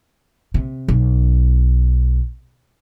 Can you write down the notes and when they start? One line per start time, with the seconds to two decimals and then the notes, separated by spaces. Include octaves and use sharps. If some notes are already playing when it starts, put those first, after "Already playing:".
0.54 C3
0.88 B1